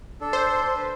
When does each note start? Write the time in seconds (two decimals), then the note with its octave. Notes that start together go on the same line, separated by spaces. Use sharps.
0.21 D4 A4
0.33 C5
0.75 B4